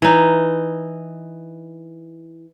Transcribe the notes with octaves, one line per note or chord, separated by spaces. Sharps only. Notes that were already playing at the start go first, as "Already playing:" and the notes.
E3 D#4